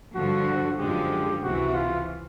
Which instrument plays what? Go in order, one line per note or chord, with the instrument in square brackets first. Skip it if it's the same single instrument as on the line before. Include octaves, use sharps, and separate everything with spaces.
[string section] G2 D3 F3 [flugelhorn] F#4
[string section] F#2 D3 F3 G#3 [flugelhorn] G4
[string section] C#2 C3 E3 [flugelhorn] F#4
[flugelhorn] F4